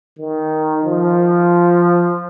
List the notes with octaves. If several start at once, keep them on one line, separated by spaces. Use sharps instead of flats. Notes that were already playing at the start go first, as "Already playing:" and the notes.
D#3
F3